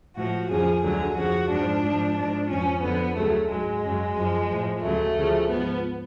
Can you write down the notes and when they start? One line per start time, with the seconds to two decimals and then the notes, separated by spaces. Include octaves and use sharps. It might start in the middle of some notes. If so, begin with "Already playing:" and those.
0.16 A2 F3 F#4
0.49 F2 C#3 F3 G#4
0.83 D2 D3 F#3 G#4
1.16 F2 C#3 F3 F#4
1.49 G#2 F3 D4
1.83 G#2 F3
2.16 G#2 F3 D4
2.49 F2 F3 C#4
2.82 F2 D3 F3 B3
3.16 D2 C#3 F#3 A3
3.49 G#2 F#3 G#3
3.83 F#2 C#3 F#3
4.16 F#2 F3
4.50 A2 F3
4.82 D2 C#3 F#3 A3
5.16 D2 C#3 F3
5.49 G#2 F3 B3